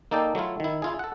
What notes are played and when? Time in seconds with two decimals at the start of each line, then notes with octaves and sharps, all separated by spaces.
0.11 A#3 D#4 A4 D5 G5
0.35 F#3 A3 E4 F4
0.60 D#3 E4
0.82 E4 F4 G#4
0.99 A4 F#5